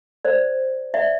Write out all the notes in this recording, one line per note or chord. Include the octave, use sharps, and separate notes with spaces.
C5 D5
D5 E5